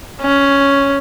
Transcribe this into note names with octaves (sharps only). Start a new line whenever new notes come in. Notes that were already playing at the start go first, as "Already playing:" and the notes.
C#4